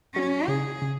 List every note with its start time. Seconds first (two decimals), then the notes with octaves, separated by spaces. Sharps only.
0.15 F#3 C#4
0.48 C#3 G#4
0.82 C#3